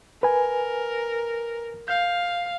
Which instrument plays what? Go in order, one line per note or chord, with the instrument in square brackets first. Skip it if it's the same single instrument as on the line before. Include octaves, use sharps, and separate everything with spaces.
[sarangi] A#4 [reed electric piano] B4 G#5
[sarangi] F5 [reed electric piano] G6